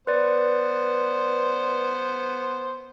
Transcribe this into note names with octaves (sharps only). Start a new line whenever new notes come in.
B3 B4 C5 D5